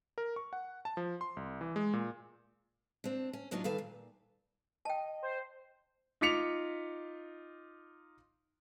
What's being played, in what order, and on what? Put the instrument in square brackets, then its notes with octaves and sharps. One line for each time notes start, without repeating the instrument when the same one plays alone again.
[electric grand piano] A#4
C#6
F#5
A5
F3
C6
C2
E3
G#3
A#2
[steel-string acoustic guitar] C4 D4
C#4
D2 A2 F#3 D4 D#4 F4
D#3 G3 A4 B4 F5
A#2
[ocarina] D#5 [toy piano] G5 A5
[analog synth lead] C5
[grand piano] D#4 F4 D6 B6 C#7 F7